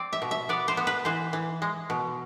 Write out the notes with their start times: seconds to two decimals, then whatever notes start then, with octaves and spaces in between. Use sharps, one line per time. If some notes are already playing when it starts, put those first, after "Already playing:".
Already playing: C4 D5
0.13 E5
0.22 B2
0.31 E5
0.49 B3 D5
0.68 C5
0.77 B3
0.87 B4
1.05 E3 C5
1.33 E3
1.62 G#3
1.90 B2